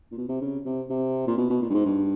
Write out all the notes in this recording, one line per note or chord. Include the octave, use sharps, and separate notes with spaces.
A#2
B2
C3
C#3
C3
C3
A#2
B2
B2
A#2
G2
G#2
G2